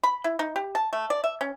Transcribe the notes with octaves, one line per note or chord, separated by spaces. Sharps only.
B5
E4
D#4
G4
A5
A3
D5
E5
C#4